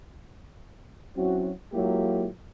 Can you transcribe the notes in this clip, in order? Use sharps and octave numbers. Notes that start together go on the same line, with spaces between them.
F#3 C4 C#4 E4 F#4
F#3 G#3 A#3 E4 F4 G4